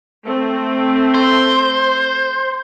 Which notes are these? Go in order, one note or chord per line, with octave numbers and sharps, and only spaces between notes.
A3 C4
C5